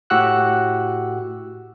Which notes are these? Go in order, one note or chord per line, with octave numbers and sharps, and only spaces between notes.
A2 F#4 G4 F#5 E6 F#6